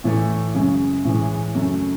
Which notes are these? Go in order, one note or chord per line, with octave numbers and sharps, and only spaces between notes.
A2 E3 A3
F#2 C#3 G#3
A2 E3 G#3
F#2 C#3 F#3 A3 C#4